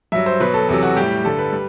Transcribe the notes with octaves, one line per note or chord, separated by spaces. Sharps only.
G2 F#3 E5
C5
B2 F#3 B4
A4
E2 C3 F#3 A4
F#4
A2 G3 G4
G2 D3 G3 A4
B4
G3